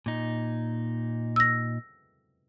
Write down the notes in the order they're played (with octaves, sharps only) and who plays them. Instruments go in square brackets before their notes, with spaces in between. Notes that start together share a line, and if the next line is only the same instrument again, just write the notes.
[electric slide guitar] A#2 D#4
[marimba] E6 A#6